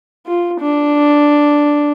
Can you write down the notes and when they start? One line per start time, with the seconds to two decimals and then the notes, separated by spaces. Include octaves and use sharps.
0.27 F4
0.61 D4